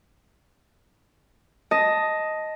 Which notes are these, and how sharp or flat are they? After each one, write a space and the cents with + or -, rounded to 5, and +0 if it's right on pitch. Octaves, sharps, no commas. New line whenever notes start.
D#5 +5 A5 +0